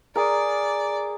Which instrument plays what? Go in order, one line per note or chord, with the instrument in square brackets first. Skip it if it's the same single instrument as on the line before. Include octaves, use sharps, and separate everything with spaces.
[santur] G#4 A#4 [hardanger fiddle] D5